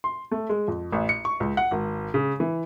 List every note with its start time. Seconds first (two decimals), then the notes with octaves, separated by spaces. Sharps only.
0.04 C6
0.31 A3
0.49 G#3
0.68 F2
0.92 A1
1.09 C#7
1.25 C#6
1.40 C#2
1.57 F#5
1.71 G#1
2.14 C#3
2.40 E3